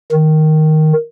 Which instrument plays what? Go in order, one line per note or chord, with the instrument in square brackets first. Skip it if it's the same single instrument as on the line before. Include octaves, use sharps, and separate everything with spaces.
[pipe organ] D#3